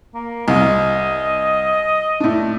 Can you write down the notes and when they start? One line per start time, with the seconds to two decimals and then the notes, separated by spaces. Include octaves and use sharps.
0.15 A#3
0.48 C2 D#5
2.20 A2 D4